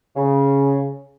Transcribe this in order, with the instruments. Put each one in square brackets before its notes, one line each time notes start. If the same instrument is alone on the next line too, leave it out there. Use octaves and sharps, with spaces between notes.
[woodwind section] C#3